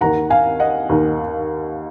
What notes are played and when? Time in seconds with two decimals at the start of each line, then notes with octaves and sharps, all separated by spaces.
0.01 D#2 D#3 F#5 A#5
0.30 F5 G#5
0.60 D#5 F#5
0.89 D#2 D#3